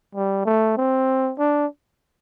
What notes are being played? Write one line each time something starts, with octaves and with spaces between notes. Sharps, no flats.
G3
A3
C4
D4